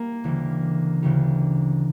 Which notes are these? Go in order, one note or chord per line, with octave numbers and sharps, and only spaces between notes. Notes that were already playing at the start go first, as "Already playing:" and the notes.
Already playing: G3 A#3
D2 C#3 E3 G3
D2 C#3 E3 G3